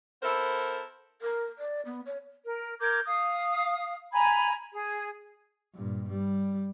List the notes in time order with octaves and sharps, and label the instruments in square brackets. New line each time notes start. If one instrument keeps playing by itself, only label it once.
[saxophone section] B3 E4 A4 A#4 C5
[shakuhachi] A#4
D5
B3
C#5
[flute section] A#4
A#4 D6 G6 G#6
F5 D#6
G#5 A#5 B5 G#6
G#4
[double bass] G2 A#2
G3